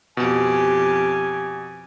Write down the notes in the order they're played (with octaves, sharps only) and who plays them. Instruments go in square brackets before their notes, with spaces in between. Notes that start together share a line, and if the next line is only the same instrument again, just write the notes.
[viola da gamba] F2 G4 [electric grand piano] B2 [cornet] G#5